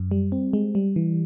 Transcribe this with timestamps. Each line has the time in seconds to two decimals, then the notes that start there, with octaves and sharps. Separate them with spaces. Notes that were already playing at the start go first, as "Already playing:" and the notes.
Already playing: F#2
0.11 G3
0.32 C4
0.53 G#3
0.75 G3
0.96 E3